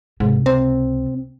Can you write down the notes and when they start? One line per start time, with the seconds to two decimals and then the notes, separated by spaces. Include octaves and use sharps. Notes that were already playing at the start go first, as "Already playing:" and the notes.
0.20 C#2 G#2 C3
0.46 C4